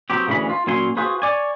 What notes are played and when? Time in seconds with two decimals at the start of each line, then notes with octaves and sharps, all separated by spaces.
0.10 F#3 B3 C4 G4
0.28 D2 C#3 E3 G#3 B5
0.50 F4
0.67 A#2 F#3 C#4 G#5 C6
0.97 F4 F#4 G#4 B4 C5
1.22 C#5 D5 G#5